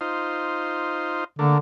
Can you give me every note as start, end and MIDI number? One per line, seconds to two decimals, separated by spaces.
0.01 1.24 63
0.01 1.24 65
0.01 1.24 72
1.39 1.59 50
1.39 1.58 57
1.39 1.58 58
1.39 1.58 62